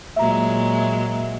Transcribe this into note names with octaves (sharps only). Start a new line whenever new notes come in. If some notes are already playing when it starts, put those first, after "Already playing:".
A#2 F#3 G#3 E5 A#5